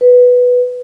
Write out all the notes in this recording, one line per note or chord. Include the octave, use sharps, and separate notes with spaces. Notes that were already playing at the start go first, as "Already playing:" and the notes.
B4